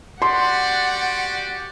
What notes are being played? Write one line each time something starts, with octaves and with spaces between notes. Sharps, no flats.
F#4 G4 D5 F#5 C6